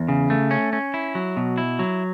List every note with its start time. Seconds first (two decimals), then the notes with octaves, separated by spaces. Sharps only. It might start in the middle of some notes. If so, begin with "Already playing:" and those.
Already playing: E2
0.08 C#3
0.30 A3
0.51 C#4
0.73 C#4
0.94 E4
1.15 F#3
1.37 B2
1.58 E4
1.79 F#3